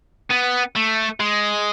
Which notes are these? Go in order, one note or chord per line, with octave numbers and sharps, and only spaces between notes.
B3
A3
G#3